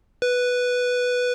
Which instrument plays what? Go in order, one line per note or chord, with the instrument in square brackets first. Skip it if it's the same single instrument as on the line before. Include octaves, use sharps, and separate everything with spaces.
[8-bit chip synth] B4